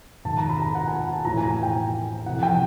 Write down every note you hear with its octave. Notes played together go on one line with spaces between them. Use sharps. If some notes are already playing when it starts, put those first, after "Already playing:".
G#2 D#3 A5
A#5
B5
A#5
F#5
G#5
A5
A2 E3 A#5
G#5
G#5
G5
F2 C3 E3 F#5
G5